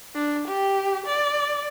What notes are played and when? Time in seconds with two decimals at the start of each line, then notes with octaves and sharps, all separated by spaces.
0.15 D4
0.48 G4
1.06 D5